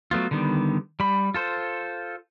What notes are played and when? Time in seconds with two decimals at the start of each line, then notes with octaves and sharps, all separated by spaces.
0.11 F#3 A3 B3 F4
0.31 D3 D#3 G3 B3
1.00 G3 B5
1.34 F4 A4 C5